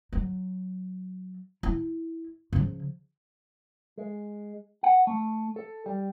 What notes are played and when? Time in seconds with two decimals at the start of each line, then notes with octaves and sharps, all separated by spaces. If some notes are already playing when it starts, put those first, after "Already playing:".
0.13 F#3
1.63 E4
2.53 C#3 F3
3.98 G#3
4.83 F#5
5.07 A3
5.56 A4
5.86 G3